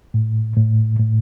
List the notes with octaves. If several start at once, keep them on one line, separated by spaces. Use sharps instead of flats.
A2
A2
A2